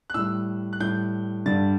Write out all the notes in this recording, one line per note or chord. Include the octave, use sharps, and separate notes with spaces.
F#6
A2 G3 E6
F#6
A2 G3 G6
G2 D3 G3 A6